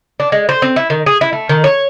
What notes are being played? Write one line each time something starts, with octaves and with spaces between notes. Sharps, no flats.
D4
G#3
C5
C4
E4
D#3
G#4
E4
A3
D#3
C#5